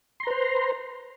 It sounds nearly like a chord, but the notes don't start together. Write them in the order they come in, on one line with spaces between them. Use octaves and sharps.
C6 A#5 B4 C5